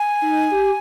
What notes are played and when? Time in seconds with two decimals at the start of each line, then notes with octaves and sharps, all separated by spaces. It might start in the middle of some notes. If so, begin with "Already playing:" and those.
Already playing: G#5
0.22 D#4
0.51 G4